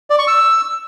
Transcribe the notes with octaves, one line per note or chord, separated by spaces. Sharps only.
D5
C#6
E6